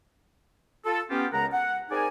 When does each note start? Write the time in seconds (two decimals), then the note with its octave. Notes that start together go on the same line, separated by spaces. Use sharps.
0.86 F4 A4
1.10 B3 C#4 F4 G4
1.32 C#2 C#3 G#3 A#4 F#5 A#5
1.53 F#5
1.90 C4 D#4 G#4 A#4 D5 G#5